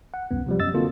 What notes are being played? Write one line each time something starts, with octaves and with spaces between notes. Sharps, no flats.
F#5
C2 F#2 B3
C3 F3 G3
F#2 D#5 E6 A6
D3 A#3 C4 F4 F#4 A4